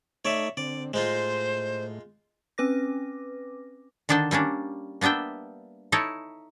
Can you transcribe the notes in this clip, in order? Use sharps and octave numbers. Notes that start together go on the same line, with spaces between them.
A3 D#4 C#5 D5 E5
D3 C4 D5
A2 G#3 D#4 F4 C5
C4 C#4 B4 D6 A#6
D3 D#3 D4 G5 A5
G3 A#3 C#4 D4
A#3 B3 D4 E5 G5
D#4 E4 A4 C#5